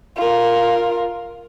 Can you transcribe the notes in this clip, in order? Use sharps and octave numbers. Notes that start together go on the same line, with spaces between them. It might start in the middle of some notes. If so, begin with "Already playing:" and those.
F4 A#4